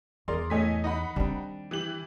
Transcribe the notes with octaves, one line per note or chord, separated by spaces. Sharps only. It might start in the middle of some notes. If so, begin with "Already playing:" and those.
E2 G#4 A#4 D5 C6
A2 A3 C#5 D#5 G#5 B6
D#4 D#5 F#5 B5
D#3 G3 C4 D4
E3 G4 F#7